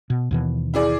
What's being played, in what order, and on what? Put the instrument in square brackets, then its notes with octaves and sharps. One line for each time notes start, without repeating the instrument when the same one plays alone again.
[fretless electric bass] B2
D#2 B2 E3
[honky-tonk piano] E4 G#4 D5